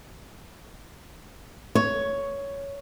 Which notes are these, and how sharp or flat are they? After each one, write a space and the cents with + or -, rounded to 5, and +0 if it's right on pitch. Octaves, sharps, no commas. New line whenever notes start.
C#5 +10